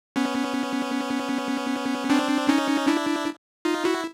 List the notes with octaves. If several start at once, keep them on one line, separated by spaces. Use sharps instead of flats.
B3 C#4
C4 D4
C#4 D#4
D4 E4
D#4 F4
E4 F#4